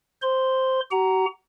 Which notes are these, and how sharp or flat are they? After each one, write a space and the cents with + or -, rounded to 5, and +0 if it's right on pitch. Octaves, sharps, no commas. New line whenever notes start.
C5 +0 C6 -5
F#4 +45 F#5 +25 A#5 +0